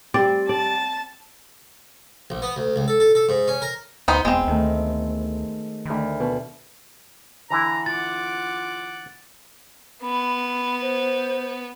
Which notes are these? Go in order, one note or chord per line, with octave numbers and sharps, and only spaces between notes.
G3 C4 D5
D5 A5
A#1
B3
D2
C#2
A4
A4
A4
G#2
C#4
A#4
D2 B3 D#4 C5
E1 G#3 B3 C4
D2 D#3 A3
D2 D#3 B5
B2 B4
D3 E3 E4 A#5
F4 F#5 D6 A6
B3 B5
B5
C5